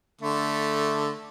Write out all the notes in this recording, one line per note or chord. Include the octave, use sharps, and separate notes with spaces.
D3 A3